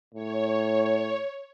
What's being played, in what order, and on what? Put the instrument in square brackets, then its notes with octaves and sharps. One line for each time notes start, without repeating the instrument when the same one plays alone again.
[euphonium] A2 [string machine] C#5